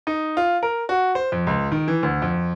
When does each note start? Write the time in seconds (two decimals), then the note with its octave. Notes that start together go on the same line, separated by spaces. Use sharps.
0.07 D#4
0.37 F4
0.63 A#4
0.89 F#4
1.15 C5
1.32 F2
1.47 C#2
1.72 D#3
1.88 E3
2.03 D2
2.22 F2